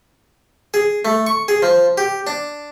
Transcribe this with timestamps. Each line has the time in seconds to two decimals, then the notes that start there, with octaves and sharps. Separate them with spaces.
0.74 G#4
1.05 A3
1.27 C#6
1.48 G#4
1.62 F3
1.98 G4
2.27 D4